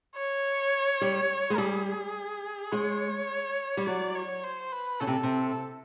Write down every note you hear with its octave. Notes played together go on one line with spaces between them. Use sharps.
C#5
G3
G#3
G3 G#4
G#3 C#5
G3
F#3 D5
C#5
C5
B4
C#3 A4
C3
C3